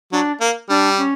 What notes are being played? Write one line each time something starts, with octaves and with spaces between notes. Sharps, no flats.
F#3 D4
A#3
G3 D4
C#4